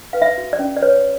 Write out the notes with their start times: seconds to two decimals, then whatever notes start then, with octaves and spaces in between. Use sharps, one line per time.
0.13 B4 F5
0.22 E5
0.38 F#4
0.53 D5
0.59 C#4
0.77 D5
0.82 B4 C#5